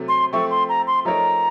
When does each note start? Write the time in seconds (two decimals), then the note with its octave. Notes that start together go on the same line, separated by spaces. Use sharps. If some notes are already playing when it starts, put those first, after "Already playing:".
Already playing: C3 F#3 A3
0.08 C6
0.33 F3 A3 C4 C#6
0.51 C6
0.69 A#5
0.87 C6
1.05 F3 A3 D#4 A#4 C#5 A#5